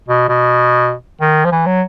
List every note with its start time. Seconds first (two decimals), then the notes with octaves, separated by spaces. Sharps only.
0.08 B2
0.29 B2
1.21 D#3
1.45 F3
1.52 E3
1.66 F#3